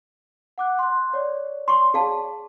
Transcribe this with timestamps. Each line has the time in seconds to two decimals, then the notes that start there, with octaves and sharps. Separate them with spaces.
0.58 F#5 D6 F#6
0.79 C6 F#6
1.13 C#5 D5
1.68 C6 C#6
1.94 G#4 F5 A5